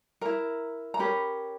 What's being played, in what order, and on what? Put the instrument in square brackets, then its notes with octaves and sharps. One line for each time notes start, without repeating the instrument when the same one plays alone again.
[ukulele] E4 A#4 A#5
A#5
C#4 G4 A#4 B5